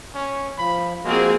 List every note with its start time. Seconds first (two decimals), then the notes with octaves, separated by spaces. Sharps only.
0.15 C#4
0.58 F3 B5
1.05 F3 G#3 A#3 C4 F#4 G#4